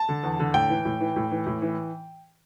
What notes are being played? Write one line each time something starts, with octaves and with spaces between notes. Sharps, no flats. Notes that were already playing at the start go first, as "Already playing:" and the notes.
Already playing: A5
D3
E2
D3
A2 G5
E3
A2
E3
A2
E3
A2
E3